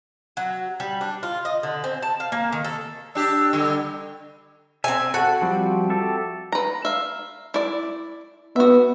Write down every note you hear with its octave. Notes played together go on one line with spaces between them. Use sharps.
F#3
G3
D4
F4
D#5
D3
C4
A5
F5
A#3
D#3
A4
D4 G4 E6
D3 G3
C4 E5 G#5
F#4 A4 F#5
F3 G3 C4
G4 A4 E5
B4 A#5
E5 F5
E4 D5
B3 F#4 E5